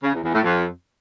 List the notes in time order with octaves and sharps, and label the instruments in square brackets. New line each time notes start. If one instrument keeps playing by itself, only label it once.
[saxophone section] C#3
E2
E2
A2
F2